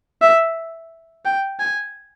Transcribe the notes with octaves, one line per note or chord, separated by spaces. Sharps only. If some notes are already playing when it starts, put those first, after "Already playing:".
E5
G5
G#5